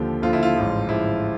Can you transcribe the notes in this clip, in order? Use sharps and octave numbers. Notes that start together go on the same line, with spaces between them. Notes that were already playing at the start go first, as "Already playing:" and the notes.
Already playing: D#2 D3 F3 G4
D#2 D3 F3 F4
E4
F4
A1 G#2 F3
A1 G#2 F3 E4